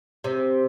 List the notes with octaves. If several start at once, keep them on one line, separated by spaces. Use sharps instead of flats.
C3